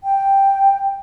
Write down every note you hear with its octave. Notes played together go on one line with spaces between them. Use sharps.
G5